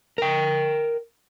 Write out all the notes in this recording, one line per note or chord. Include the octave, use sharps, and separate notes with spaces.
A#4 G5